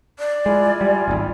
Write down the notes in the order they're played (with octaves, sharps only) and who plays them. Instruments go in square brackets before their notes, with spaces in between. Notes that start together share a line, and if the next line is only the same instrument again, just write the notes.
[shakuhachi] D5
[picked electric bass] G#3 [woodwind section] E4 F4 G#5
[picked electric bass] G3
D#1 G#1